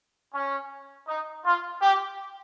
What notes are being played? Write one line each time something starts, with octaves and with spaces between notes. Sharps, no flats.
C#4
D#4
F4
G4